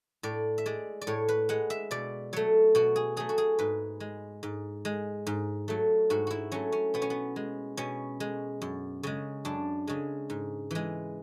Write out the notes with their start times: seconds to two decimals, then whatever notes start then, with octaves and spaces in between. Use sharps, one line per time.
0.23 A2 D5
0.58 E5
0.66 G#3 D5
1.01 D5
1.07 A2 C#5
1.28 B4
1.49 G#3 F#5
1.70 E5
1.91 B2 D5
2.33 F#3 A3 C#5
2.75 B2 F#4
2.96 G#4
3.17 F#3 A3 G#4
3.29 F#4
3.38 G#4
3.59 G#2 B4
4.00 G#3
4.43 G#2
4.85 G#3
5.27 G#2
5.68 F#3 A3
6.10 G#2 F#4
6.27 E4 F#4
6.52 F#3 A3 C#4
6.72 C#4
6.94 B2 B3
7.02 C#4
7.10 B3
7.36 G#3
7.77 B2 C#4
8.20 G#3
8.62 F#2
9.03 C#3 G#3
9.45 F#2 D4
9.87 C#3 G#3
10.30 G#2
10.71 E3 G#3